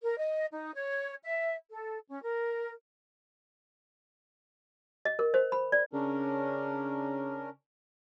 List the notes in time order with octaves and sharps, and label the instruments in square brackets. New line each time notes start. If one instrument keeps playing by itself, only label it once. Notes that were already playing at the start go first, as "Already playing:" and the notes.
[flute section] A#4
D#5
D#4
C#5
E5
A4
C#4
A#4
[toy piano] D#5
A#4
C5
B5
D5
[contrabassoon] C#3 [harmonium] C#4 D4 A#4